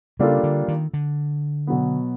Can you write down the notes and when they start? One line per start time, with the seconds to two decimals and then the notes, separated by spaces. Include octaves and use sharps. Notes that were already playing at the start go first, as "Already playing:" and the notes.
0.19 C#3 G3 A#3 D4 F4 A4
0.43 D3
0.68 D#3
0.94 D3
1.67 B2 F#3 B3